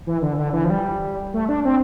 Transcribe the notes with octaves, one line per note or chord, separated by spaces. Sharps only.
E3
D3
D3
E3
F3
G3
A3
D4
C4